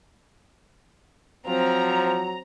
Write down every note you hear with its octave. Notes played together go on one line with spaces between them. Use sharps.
F3 F#3 C4 A#5